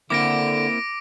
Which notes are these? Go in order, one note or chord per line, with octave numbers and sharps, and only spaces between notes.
D3 A#3 C4 E4 D6 A#6 D7